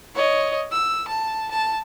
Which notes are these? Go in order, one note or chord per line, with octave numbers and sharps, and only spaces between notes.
C#5 D#5
E6
A5
A5